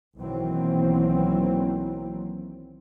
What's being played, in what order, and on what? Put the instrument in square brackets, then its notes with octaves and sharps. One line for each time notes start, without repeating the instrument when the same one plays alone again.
[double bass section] B1 D#3 E3 F#3 A#3 C4